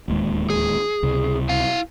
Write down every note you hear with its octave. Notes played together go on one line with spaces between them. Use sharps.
D1 D#2 G#3
G#4
C#2 C3
E4 F5